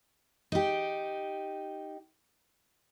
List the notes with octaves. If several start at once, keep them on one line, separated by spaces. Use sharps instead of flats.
D#4 G4